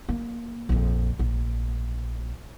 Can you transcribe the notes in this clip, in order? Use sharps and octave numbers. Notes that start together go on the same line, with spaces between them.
A#3
A#1 F2
A#1